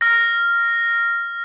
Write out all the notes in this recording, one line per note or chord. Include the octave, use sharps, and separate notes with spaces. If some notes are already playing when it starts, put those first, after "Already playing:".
F6 A#6